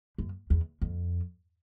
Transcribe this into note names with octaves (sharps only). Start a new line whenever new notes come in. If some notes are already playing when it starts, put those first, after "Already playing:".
F#2
E2
F2